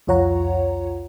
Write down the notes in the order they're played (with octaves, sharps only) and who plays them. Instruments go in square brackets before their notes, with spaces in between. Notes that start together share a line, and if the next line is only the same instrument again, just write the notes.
[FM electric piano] C2 F2 F4 C#5 F#5 A#5